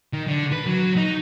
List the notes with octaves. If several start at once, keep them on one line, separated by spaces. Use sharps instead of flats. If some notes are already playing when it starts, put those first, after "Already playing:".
D#3
D3
B4
F#3
D#4